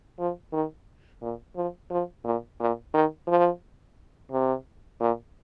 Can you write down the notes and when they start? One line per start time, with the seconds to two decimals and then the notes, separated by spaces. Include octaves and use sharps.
0.19 F3
0.53 D#3
1.22 A#2
1.56 F3
1.91 F3
2.25 A#2
2.60 A#2
2.94 D#3
3.28 F3
4.32 C3
5.00 A#2